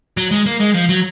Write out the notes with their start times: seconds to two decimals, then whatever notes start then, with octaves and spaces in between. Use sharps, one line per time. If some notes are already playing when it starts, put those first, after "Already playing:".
0.17 F#3
0.31 G#3
0.46 A#3
0.60 G#3
0.74 F3
0.89 F#3